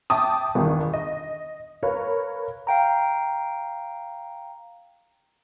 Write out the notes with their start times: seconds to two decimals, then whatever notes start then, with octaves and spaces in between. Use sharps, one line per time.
0.10 E5 G5 A5 D6 D#6
0.55 G1 E2 D#3
0.94 D#5
1.83 A#4 B4 C#5 F5
2.67 F5 G5 A#5